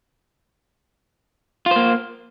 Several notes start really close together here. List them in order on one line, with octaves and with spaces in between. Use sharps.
F4 C5 A#3